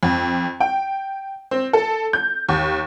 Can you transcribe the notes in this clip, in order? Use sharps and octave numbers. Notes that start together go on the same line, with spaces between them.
F2
G5
C4
A4
G6
D#2